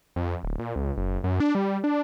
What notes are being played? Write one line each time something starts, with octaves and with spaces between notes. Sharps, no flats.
F2
D1
A#2
C#2
F#1
F#2
D4
G3
D4